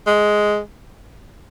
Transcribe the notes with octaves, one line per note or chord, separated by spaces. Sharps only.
G#3